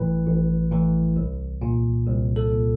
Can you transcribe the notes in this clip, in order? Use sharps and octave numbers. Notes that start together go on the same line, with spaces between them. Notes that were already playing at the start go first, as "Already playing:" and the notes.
Already playing: A1 A2 E3 B4
A1
A2 E3
C2
A#2
C2
A4
A#2